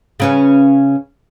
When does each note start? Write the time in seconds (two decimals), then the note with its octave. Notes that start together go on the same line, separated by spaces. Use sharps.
0.20 C#3 C#4 B4